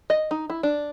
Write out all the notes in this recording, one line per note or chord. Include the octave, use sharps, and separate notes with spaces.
D#5
D#4
E4
D4